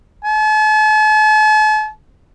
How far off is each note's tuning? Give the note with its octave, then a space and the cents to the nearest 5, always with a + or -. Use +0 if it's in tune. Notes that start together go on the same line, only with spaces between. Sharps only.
A5 -45